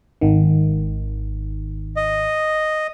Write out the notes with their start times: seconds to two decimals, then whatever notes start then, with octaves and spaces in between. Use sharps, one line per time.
0.21 G#1 D#3
1.96 D#5